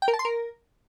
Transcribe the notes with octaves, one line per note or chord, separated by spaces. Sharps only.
G5
A#4
A5
C6
A#4